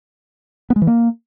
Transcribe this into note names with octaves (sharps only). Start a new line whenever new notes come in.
B3
G#3
E3
A#3